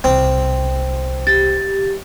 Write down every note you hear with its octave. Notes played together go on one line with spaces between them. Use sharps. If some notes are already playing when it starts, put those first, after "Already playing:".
C2 B2 C4
G4 A6